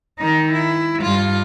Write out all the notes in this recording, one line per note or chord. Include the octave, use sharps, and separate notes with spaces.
D#3 D#4
E4
G2 F4